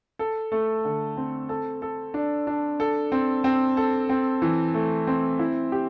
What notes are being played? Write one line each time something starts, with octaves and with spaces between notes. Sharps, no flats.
A4
A3
D3
C4
A4
A4
D4
D4
A4
C4
C4
A4
C4
E3
A3
C4
E4
G4